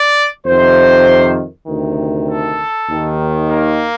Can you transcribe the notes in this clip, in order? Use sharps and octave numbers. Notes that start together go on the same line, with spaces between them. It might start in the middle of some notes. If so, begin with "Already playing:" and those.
Already playing: D5
F2 C3 D#3 C5
D2 C3 D#3
A4
D#2 D#3
A#3